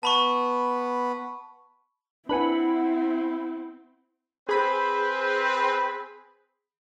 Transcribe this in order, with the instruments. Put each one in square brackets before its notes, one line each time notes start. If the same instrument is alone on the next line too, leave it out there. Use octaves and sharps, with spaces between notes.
[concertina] B3 B4 [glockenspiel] A5 B5 C#6
[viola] C4 [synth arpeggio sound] D4 B4 G#5 [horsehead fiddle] E4 [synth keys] F#5 B5
[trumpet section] C4 B4 C5 [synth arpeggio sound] G#4 B5